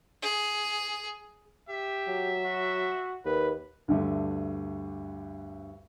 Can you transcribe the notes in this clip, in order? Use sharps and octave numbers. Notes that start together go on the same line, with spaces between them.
G#4
G4 E5
F#3
F#4
D#2 B4
D2 G2 D3 A4 E5